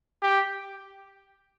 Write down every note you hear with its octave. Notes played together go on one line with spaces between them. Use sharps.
G4